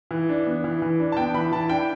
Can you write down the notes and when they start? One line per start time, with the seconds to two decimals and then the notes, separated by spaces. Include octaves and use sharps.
0.11 E3
0.29 D4
0.46 B3
0.64 E3
0.82 E3
1.00 D4
1.12 A5
1.17 B3 G5
1.34 E3 B5
1.52 E3 A5
1.70 D4 G5